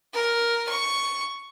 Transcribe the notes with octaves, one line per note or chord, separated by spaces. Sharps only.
A#4
C#6